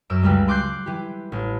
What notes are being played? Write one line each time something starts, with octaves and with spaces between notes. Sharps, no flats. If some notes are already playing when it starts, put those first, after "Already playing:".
F#2 E6 D7
C#2 G3 G#3
C6 D6 F#6 G6 C7
E3 G4
A1